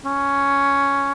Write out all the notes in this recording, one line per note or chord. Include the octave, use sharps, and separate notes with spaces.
C#4